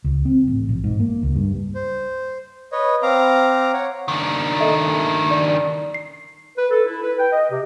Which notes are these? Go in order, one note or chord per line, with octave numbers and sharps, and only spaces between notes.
C#2
C4
A1
A#1
G#2
A#3
C#2
G2
C5
B4 C#5 D#5
C4 F5 A#5 D6
C#5 F#5
D#3 D4
A4 D#5 E5
D5
C7
B4
A4
E4
B4
G5
D#5
C3